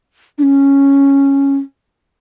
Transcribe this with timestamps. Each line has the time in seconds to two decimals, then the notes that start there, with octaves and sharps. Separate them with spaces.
0.38 D4
0.43 C#4